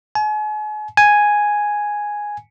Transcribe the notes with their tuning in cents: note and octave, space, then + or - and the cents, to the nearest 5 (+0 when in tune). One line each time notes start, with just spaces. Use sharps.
G#5 +40
G#5 +0